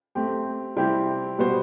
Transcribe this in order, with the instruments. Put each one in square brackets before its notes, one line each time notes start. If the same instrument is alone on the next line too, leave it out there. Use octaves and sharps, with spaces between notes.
[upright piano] A3 C4 G4
C3 G3 C4 E4 G4
B2 G3 B3 F#4 C5